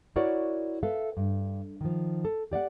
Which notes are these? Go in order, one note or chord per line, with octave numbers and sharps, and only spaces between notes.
E4 F#4 A#4 C#5 D5 F#5
A4 B4 E5 F5
G2
D#3 F3
A4
G4 D5 E5 F#5